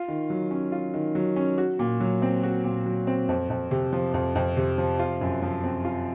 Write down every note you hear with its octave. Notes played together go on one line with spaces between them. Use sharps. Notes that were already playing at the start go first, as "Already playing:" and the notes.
Already playing: F4
D#3
F#3
C#4
F4
D#3
F#3
C#4
F#4
A#2
F#3
C4
F#4
A#2
F#3
C4
F2
F2
C3
F3
F2
F2
C3
F3
F4
F#2
F3
C4
F4